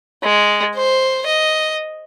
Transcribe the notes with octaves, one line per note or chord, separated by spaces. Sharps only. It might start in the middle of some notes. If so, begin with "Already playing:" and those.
G#3
C5
D#5